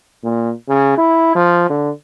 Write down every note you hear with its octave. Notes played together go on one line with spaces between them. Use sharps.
A#2
C#3
E4
F3
D3